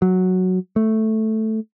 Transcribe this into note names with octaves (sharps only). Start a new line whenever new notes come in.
F#3
A3